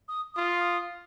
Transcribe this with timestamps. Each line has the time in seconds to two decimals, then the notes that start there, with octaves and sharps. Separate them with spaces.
0.08 D#6
0.34 F4 D#6
0.61 D#6